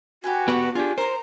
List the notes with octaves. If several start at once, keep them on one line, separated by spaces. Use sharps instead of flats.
F#4 G4 B4 G#5
B3 G4 A4 B4 D5 C#6
D4 F4 G4 G#4
A#4 C5 A#5 C6